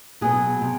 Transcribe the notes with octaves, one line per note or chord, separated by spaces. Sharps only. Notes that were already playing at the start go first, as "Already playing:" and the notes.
B2 F#3 G#4
C3